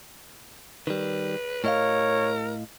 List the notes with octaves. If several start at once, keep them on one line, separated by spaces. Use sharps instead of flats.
D#3 G3 B4
A2 A#4 C#5 D#5 F5